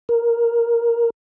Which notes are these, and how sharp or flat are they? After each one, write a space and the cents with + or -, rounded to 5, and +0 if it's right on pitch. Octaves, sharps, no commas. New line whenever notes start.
A#4 +5